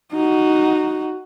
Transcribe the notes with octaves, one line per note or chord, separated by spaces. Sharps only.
D#4 F#4